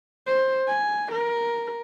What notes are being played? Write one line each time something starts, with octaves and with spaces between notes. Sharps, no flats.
C5
G#5
A#4